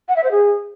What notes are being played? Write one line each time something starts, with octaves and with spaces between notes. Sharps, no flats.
F#5
E5
C5
G#4